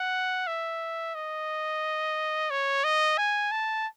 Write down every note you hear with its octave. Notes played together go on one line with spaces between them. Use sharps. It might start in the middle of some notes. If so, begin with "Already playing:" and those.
Already playing: F#5
E5
D#5
C#5
D#5
G#5
A5